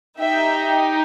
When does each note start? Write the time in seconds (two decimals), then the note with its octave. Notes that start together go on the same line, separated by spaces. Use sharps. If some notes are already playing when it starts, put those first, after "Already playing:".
0.19 D#4 G4 E5 G5